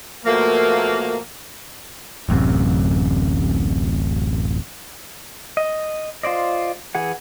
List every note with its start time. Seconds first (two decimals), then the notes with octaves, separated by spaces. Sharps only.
0.25 B2 F3 A3 A#3
2.29 D1 A1 F#2 C3
5.57 D#5
6.23 F4 C5 D5 D#5
6.95 E3 G#4 F#5